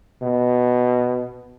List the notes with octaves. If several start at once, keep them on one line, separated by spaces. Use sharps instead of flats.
B2